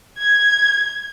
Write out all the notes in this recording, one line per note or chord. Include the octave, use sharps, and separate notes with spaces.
G#6